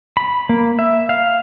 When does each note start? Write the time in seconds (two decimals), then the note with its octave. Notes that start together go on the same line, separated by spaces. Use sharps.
0.17 B5
0.49 A#3
0.79 E5
1.09 F5